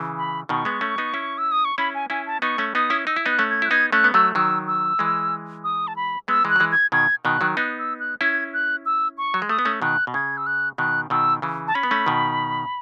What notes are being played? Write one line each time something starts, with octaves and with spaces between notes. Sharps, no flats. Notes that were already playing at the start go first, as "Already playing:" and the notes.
Already playing: C#3 E3
B5
B2 D#3 C#6
G#3 B3
A3 C#4
B3 D#4
C#4 E4
E6
D#6
C#6
C#4 E4 B5
G#5
C#4 E4 G#5
A5
B3 D#4 C#6
A3 C#4
B3 D#4 D#6
C#4 E4
D#4 E6
E4
B3 D#4 F#6
A3 C#4
G#6
E4 F#6
B3 D#4 G#6
A3 C#4 F#6
B3
F#3 A3 E6
D#3 F#3 E6
E6
E3 G#3
D#6
A5
B5
G#3 B3 E6
E3 G#3
F#6
F#3
E3 G#3
G#6
B2 D#3 G#6
B2 D#3 F#6
D#3 F#3
B3 D#4 F#6
E6
F#6
C#4 E4 G#6
F#6
E6
C#6
F#3
G#3
A3 D#6
B3
A3 C#4
B2 D#3 F#6
B2
C#3 G#6
E6
F#6
B2 D#3 F#6
B2 D#3 E6
C#3 E3
A5
C#4 B5
B3
A3 C#4
B2 D#3